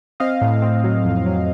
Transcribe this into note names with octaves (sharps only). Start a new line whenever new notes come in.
C4 D#5 F5
A2
C4
F#3
F2
F#3